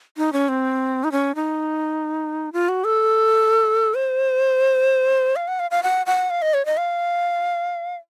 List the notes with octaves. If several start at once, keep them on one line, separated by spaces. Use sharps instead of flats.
D#4
C#4
C4
D#4
C#4
D#4
F4
F#4
A4
C5
F5
F#5
F5
F5
F#5
F#5
F5
D#5
C#5
D#5
F5